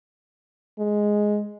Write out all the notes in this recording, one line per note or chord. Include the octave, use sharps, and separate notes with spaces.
G#3